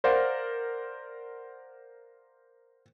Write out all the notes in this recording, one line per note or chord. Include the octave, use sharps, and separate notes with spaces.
A#4 C5 D5 F5 F#5